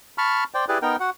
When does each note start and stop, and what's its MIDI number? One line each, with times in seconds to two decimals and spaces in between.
0.18 0.44 81
0.18 0.44 83
0.18 0.44 85
0.18 0.44 89
0.54 0.65 72
0.54 0.65 74
0.54 0.65 79
0.68 0.78 64
0.68 0.78 67
0.68 0.78 68
0.68 0.78 71
0.68 0.78 74
0.82 0.96 59
0.82 0.96 63
0.82 0.96 70
0.82 0.96 79
1.00 1.10 66
1.00 1.10 78